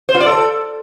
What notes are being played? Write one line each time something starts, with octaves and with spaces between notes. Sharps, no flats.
C5
F4
D5
A4